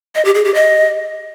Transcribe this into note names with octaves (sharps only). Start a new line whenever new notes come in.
D#5
G4
G#4
G4
D#5